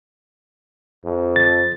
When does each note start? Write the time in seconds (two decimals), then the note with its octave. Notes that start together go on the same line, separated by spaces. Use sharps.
1.04 F2
1.36 A6